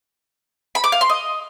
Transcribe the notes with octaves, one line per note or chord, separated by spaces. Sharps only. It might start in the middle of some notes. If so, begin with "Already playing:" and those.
B5
D6
F5
C6
D#5